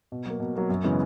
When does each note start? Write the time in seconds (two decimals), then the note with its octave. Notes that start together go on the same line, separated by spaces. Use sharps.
0.12 B2
0.26 F#3 A#3
0.40 B2
0.55 F#3 A#3
0.69 F#2
0.84 C#3 E3 G#3 B3